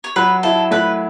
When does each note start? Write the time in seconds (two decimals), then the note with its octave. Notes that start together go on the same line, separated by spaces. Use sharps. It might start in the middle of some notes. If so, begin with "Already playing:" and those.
0.04 C#5
0.16 F#3 B4
0.43 E4 A4
0.71 A3 B4